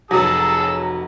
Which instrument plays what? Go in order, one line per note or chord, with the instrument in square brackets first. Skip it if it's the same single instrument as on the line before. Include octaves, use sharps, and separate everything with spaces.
[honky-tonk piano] F1 F#3 [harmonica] G#4 A5 E6